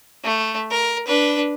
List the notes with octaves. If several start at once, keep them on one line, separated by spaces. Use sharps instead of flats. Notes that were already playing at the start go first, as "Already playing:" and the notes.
A3
A#4
D4 B4